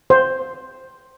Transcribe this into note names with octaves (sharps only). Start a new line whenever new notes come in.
C5